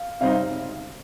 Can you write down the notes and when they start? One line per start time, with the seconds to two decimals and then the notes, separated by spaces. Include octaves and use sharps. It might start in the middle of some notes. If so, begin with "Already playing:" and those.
Already playing: F5
0.21 C3 G3 C4 D#4 F5
0.31 F5